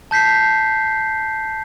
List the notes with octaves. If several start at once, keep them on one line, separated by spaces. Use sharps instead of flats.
A5 G6 B6 C7